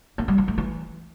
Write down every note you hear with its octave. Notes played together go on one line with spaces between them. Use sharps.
A#3
G3
F3
A3
E3